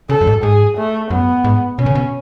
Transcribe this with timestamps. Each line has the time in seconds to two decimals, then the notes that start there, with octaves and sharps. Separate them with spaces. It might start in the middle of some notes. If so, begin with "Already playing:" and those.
0.09 C#3 A4
0.21 F#2
0.27 G#2
0.43 G#2 G#4
0.77 A3
1.10 F#2 B3
1.44 G#2
1.79 B2 C#4
1.86 C#3
1.95 B2